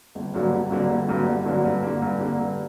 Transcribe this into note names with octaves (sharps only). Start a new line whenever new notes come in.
G1
G2 D3 F#3 A#3
G1
G2 D3 F#3 A#3
G1
G2 D3 F#3 A#3
G1
G2 D3 F#3 A#3
G2
D3 A#3
G2
D3 A#3
G2